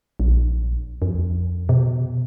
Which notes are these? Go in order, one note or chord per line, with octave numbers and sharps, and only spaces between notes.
A#1
F2
B2